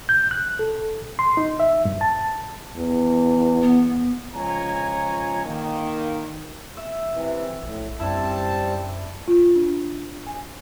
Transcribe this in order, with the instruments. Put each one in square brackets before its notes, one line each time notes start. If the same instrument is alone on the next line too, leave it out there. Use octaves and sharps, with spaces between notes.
[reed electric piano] G6
F#6
A4
C6
D#4
E5
G2
A5
[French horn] E2
[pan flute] B3
[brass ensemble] C#2 F3 C#5 G#5 A#5
D#3 A#3
[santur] E5
[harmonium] C3 E3
[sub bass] A#1 [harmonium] A2
[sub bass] F#2 [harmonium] G3 C4 A5 [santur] D4 E4
[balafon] F4
D4
G#5